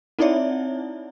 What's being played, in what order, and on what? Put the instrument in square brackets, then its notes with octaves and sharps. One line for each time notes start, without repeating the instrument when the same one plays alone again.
[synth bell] C4 D#4 E4 C#5 D5 E5